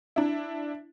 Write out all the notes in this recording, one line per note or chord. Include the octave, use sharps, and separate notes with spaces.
D4 E4